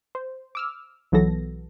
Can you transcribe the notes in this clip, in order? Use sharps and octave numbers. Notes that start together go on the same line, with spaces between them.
C5
D6 E6 F6
B1 E3 F#3 B3 A4 A#6